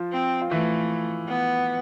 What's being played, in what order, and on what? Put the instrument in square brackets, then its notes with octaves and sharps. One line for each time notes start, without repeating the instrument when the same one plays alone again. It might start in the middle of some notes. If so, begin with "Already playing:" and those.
Already playing: [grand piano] F3 F4
[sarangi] C4
[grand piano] F4
[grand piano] E3 E4 [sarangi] A3
[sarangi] B3